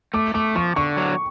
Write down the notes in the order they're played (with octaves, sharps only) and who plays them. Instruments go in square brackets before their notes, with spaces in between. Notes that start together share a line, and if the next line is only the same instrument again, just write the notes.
[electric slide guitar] A3 [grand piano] D6
[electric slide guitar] A3 [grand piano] D6
[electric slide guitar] F3 [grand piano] C#6
[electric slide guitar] D3 [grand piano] C#6
[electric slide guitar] F#3